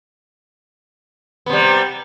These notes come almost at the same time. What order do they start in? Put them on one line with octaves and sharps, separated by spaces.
B3 C3 G3